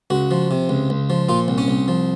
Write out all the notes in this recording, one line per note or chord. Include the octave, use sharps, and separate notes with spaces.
C#2 F#4
F3
C3
C#2
C#2
F3
A#2 F4
C2
C#4
C2
F3